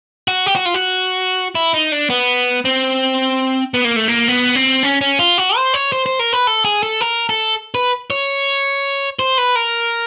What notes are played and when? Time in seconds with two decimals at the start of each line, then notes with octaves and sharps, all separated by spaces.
0.28 F#4
0.46 G4
0.56 F#4
0.66 F4
0.74 F#4
1.55 E4
1.74 D#4
1.92 D4
2.10 B3
2.65 C4
3.74 B3
3.85 A#3
3.96 A3
4.08 A#3
4.28 B3
4.55 C4
4.83 C#4
5.01 C#4
5.19 F4
5.38 F#4
5.56 C5
5.74 C#5
5.92 C5
6.06 C5
6.19 A#4
6.33 B4
6.47 A4
6.65 G#4
6.83 A4
7.01 A#4
7.29 A4
7.75 B4
8.10 C#5
9.19 C5
9.38 B4
9.56 A#4